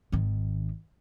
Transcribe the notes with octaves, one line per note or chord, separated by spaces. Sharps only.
G#1 D#3